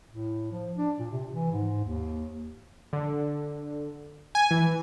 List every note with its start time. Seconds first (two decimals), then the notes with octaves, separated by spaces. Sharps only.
0.10 A2
0.51 F3
0.76 D4
0.99 A#2
1.11 C3
1.33 E3
1.52 G#2
1.84 D#2
2.93 D3
4.35 G#5
4.51 E3